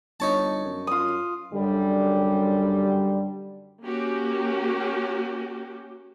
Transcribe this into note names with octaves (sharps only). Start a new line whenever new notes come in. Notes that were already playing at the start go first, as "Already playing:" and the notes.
G1 D#4 C#5 A5
F#2
F4 D#6
F#2 D3 G3
A#3 C#4 F#4 G4